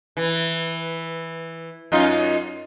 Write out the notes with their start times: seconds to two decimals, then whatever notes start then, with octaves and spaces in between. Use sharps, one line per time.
0.17 E3
1.92 F#2 D#4 F4